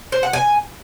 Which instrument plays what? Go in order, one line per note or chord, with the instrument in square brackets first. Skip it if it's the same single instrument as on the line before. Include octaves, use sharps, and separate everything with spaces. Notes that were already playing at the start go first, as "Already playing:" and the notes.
[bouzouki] C5
F#5
G#5